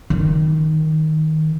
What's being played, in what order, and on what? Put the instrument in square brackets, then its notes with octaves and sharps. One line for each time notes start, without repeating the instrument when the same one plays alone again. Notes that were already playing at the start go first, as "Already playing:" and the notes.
[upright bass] D#3